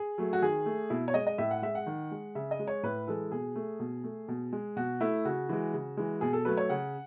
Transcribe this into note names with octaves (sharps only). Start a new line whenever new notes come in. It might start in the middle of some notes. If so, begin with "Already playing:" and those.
Already playing: G#4
F#3 A3
F#4
D#3 G#4
A3
B2 E4
C#5
G#3 D#5
D#5
A2 E5
F#5
G#3 E5
F#5
D#3
G#3
C#3 E5
D#5
G#3
C#5
A2 B4
E3 G#3 A4
B2 G#4
A3
B2
A3
B2
G#3
B2 F#4
A3 E4
C#3 F#4
E3 G#3
C#3
E3 G#3
B2 G#4
A4
F#3 A3 B4
C#5
C#3 F#5